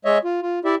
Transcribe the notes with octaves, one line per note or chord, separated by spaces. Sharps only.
G#3 C#5 D#5 E5
F4
F4
E4 G4 D5 E5